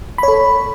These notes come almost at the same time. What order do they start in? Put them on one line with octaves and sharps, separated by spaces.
B5 C#5 A4